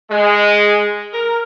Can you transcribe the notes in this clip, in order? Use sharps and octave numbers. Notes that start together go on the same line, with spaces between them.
G#3
A#4